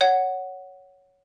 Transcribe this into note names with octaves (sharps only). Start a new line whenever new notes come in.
C#5 F#5